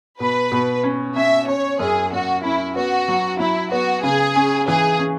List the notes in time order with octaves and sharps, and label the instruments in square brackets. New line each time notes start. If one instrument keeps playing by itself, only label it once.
[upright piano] B2 [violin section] B4
[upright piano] B2
C#4
[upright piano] C#4 [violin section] E5
[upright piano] C#4 [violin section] C#5
[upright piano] F#2 [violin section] G#4
[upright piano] F#2 [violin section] F#4
[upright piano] C#4 [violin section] E4
[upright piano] B3 [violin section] F#4
[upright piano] F#3
[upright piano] F#3 [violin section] E4
[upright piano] B3 [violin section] F#4
[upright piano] C#3 [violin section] G#4
[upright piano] C#4
[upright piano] E3 [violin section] G#4
[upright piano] C#4